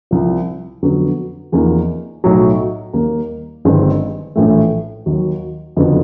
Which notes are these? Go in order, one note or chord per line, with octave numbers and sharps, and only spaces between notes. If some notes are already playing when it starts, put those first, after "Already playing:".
C2 C3 F3
F2 D3 F#3 B3
E2 C3 F3 A#3 D#4
B1 A2 F#3
D#2 D#3 G3 A#3
G1 G2 D#3 G#3 C4
A#1 A2 E3 A3
D#2 D#3 F#3
F#1 F2 D3 F#3 B3